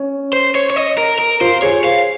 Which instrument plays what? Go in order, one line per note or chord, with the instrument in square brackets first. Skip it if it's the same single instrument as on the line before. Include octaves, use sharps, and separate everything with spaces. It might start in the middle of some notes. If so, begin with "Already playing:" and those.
Already playing: [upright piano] C#4
[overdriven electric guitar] C5
C#5
C#5
D#5
A#4
A#4
[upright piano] F4 [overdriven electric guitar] C5
[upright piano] G#4 [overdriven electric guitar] C#5
[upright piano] C5 [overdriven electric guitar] F5